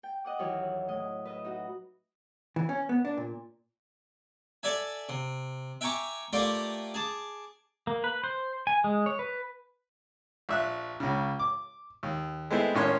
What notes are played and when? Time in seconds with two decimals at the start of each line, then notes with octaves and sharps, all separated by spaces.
0.03 G5
0.24 D#5 F#5 D6
0.39 D#2 D#3 E3 F#3 C#5 E6
0.88 A2 D#5
1.25 B4 D#5 E5
1.44 D#4 F#4
2.56 E3
2.69 C#4
2.89 B3
3.05 D4
3.17 A#2
4.63 A4 D5 E5 G#5
5.09 C3
5.81 E5 G5 G#5 A#5 C#6 D6
6.33 A3 A#3 F4 G4 D5
6.94 G#4 A5 D6
7.87 A#3
8.04 B4
8.24 C5
8.67 G#5
8.84 G#3
9.06 C#5
9.19 B4
10.49 A#1 E5 F#6
11.00 C#2 C#3
11.39 D6
12.03 D#2
12.51 G#3 A3 B3 C4 E4
12.75 G#1 A2 A#3 C#4 C#5 C6